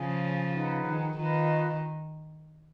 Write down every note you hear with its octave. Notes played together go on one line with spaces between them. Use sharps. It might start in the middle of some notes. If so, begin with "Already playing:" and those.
Already playing: C#3 F3 G#4 C#5 G#5
D#4 G#4 B4 F#5
D#3
D#3 F4 B4 D#5